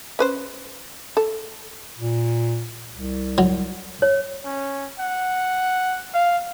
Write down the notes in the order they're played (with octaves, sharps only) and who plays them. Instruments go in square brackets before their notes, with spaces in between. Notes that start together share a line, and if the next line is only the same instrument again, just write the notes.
[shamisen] C#4 B4 C5
A4
[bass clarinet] A#2
C2
[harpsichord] F#3
[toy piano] C#5
[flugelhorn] C#4
F#5
F5